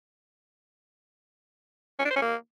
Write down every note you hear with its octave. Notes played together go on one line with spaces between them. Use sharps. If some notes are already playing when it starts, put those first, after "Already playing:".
C#4
D4
C5
C#4
A#3